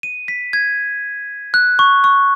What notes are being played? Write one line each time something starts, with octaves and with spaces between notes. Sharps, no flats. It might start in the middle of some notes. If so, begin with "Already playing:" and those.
D#7
B6
G#6
F#6
C#6
C#6